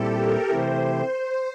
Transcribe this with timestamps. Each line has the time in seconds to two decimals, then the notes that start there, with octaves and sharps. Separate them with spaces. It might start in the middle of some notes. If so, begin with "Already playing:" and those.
Already playing: A#2 G3 C4 E4 G4 A4
0.18 A#4
0.50 C3 E3 A3 E4 G4 C5